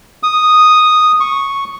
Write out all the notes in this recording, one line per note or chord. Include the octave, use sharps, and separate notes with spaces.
D#6
C#6